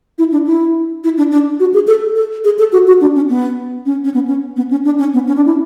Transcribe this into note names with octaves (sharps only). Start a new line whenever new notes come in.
E4
D4
E4
E4
D4
D4
F#4
G#4
A4
A4
G#4
A4
F#4
F#4
D4
C#4
B3
C#4
C#4
B3
C#4
B3
C#4
D4
C#4
B3
C#4
D4
E4